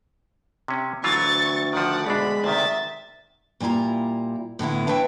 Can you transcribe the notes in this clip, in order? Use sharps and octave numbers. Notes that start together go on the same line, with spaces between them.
C3 C#4
D2 E3 F#3 F4 C#6 A6
D#3 F3 D5 F#5
D2 B2 G#3 D4 B5
D2 C3 D#3 E5 A6
A#2 G3 E4 F4 A#5
A2 D3 B3 E4
D4 B4 C#5 E5 G5